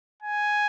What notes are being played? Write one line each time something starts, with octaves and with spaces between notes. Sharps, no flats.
G#5